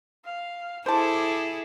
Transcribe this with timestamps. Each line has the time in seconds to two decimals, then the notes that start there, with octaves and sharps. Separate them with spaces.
0.25 F5
0.86 E4 G#4 A4 C5 A5 D6